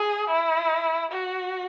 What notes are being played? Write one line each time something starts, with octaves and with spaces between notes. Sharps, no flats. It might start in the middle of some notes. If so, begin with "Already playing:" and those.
Already playing: G#4
E4
F#4